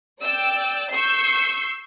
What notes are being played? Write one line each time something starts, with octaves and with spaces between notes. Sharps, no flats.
D5 G5 E6
C#6 E6 G6 C7